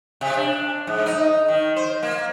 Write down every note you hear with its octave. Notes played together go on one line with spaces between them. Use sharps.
C3
D4
G#2
D#4
D#3
C5
A#3